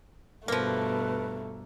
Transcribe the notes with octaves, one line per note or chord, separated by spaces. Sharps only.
G2 B2 F3 A3 A#3 B4